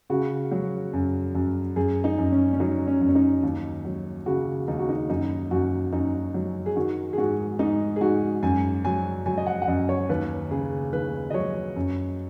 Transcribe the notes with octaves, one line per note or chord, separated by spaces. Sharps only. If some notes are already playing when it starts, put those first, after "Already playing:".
C#3 F#4
F#3
F#2
F#2
F#2 G#4
D#4
F#2
C#4
C#4
F#3 D#4
C#4
F#2
C#4
D#4
D#2
F#3
C#3 F#4
D#2 D#4
F#4
D#4
F#2 D#4
F#2 F#4
F#2 D#4
F#3
G#4
D#3 F#4
G#4
G#2 F#4
G#2 D#4
G#4
G#2 F#4
F#2 G#5
F#3 G#5
F#3 G#5
D#5
F#5
F#5
F#2 D#5
C#5
D#2 B4
C#3 G#4
D#2 B4
D#5
F#3 C#5
F#2